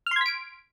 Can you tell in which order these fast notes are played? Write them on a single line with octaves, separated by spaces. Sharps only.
F6 C6 G#6 B6 D7